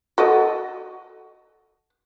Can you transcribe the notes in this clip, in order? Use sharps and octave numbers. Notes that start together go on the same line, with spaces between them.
F#4 A4 D#5